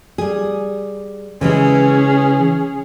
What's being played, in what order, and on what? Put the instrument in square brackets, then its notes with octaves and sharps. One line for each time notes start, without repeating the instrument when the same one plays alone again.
[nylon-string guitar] G3 G#4
[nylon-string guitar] C#3 E3 G#3 [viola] C#4 G#4